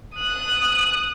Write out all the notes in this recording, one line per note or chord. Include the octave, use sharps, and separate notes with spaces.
D#6 F#6